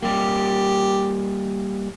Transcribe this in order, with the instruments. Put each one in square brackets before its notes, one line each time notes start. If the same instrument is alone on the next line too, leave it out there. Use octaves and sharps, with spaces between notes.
[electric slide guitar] G3 A#3 [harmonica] G4